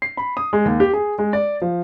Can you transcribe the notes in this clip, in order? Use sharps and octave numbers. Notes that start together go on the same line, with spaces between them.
C7
B5
D#6
G#3
D#2
G4
G#4
G#3
D5
F3